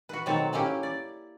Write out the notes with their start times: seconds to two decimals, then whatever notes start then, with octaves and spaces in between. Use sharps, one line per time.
0.09 F#4 B4
0.26 B2 D#3 F#3 A3 C4 A5
0.53 A#3 C#4 E4 G4
0.83 D5